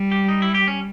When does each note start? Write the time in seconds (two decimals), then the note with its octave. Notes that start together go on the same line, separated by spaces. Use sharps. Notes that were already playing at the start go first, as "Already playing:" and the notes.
Already playing: G3
0.12 G4
0.28 D#4
0.42 E4
0.55 G4
0.68 C#4